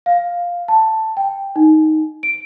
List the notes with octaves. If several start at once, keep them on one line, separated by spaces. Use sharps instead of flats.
F5
A5
G5
D#4
D7